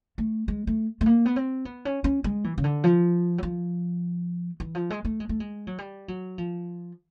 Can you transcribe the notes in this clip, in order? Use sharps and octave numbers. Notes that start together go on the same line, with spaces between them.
A3
G#3
A3
A3
A#3
B3
C4
B3
C#4
C#4
G#3
E3
C#3
D3
F3
F#3
F3
E3
F3
G#3
A3
G#3
A3
G#3
F#3
G3
F#3
F3